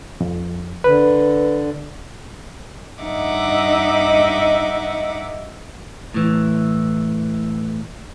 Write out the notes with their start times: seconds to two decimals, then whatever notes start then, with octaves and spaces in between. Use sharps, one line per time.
0.21 F2
0.84 D3 B4
3.02 G2 D#4 D#5 E5 F#5 D6
6.14 A2 E3